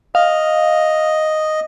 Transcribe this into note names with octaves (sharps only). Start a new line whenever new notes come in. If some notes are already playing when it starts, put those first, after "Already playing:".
D#5 F5